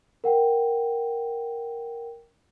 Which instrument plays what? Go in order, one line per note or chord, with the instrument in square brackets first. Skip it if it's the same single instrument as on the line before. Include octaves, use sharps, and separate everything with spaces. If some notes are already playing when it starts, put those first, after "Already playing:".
[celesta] A#4 F#5 G5